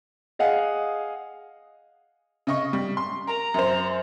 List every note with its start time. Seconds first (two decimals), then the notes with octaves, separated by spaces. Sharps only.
0.39 G#4 D#5 F5 F#5 G#5
2.47 C#3 D#5 C#6
2.73 G3
2.97 C6
3.27 A#4 A#5
3.54 F#2 C5